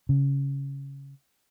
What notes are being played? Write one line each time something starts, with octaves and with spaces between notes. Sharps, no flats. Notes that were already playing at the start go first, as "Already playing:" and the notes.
C#3